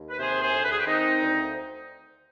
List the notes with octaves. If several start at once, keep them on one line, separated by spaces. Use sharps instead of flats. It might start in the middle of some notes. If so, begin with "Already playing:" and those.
Already playing: D#2
B4
C3 G#4 C5
G#4 C5
D2
B4
G#4
G4 B4
D#3 C4 D#4
D2